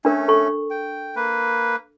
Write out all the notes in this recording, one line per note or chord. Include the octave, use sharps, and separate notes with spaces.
A3 C#4 D4 A#4
A4 C#6
G5
A#3 B4